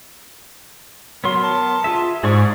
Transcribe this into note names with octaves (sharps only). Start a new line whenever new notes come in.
F#3 B3 A#4 C6
A5
F4 G#4 E5
G#2 G#4 C5 D5 C#6